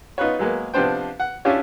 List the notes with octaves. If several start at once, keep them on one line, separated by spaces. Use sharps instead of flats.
B3 D#4 F4 B4 C#5
F#3 G#3 A#3 B3
C3 F3 B3 D4 C5 G5
F#5
C#4 D4 E4 F4 G4 C#5